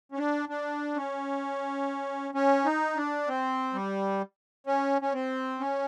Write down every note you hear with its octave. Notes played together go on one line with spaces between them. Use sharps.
C#4
D4
D4
C#4
C#4
D#4
D4
C4
G3
C#4
C#4
C4
C#4